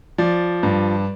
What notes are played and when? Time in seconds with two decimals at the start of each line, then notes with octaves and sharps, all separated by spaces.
0.18 F3 D5
0.63 G2